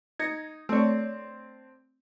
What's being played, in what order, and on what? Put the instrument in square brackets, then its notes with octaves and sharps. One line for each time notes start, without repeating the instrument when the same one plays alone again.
[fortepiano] D#4 [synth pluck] G#6 A#6 C#7
[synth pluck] A3 C#5 [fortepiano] C4 D4